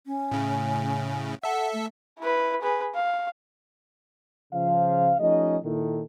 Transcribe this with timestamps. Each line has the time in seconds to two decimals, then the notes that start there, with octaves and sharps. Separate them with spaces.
0.06 C#4
0.31 A2 C#3
1.43 A4 E5 F#5
1.73 A3
2.19 E4 B4
2.61 G#4 B4
2.94 F5
4.53 C#3 F3 F5
5.19 F3 A3 C#4 D#4 G4 D#5
5.64 A#2 D#3 E4 A4